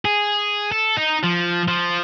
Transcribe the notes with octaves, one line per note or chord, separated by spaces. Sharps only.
G#4
A4
D#4
F3
F3